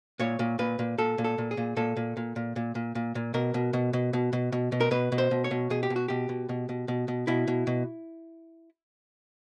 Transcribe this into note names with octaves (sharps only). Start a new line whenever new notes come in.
A#2 C#5
A#2
A#2 B4
A#2
A#2 A4
A#2
A4
A#2
G#4
A#2
A#2 A4
A#2
A#2
A#2
A#2
A#2
A#2
A#2
B2 A#4
B2
B2
B2
B2
B2
B2
B2
A#4
B2 B4
B2
C5
B2
C#5
B2
B2 G#4
G4
B2
F#4
B2 G4
B2
B2
B2
B2
B2
B2 E4
B2
B2